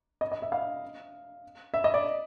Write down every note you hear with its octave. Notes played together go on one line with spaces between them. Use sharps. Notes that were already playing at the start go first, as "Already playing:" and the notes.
D#5
D#5
E5
F5
E5
D#5
D5